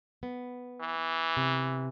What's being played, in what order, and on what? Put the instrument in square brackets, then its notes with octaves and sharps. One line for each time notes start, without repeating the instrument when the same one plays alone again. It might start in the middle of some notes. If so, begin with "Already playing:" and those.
[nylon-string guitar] B3
[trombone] E3
[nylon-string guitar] C3